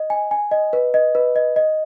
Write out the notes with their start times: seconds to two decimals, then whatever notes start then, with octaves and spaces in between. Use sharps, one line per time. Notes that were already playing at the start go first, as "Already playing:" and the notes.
Already playing: D#5
0.10 G#5
0.31 G#5
0.51 D#5
0.73 B4
0.94 D#5
1.15 B4
1.36 D#5
1.56 D#5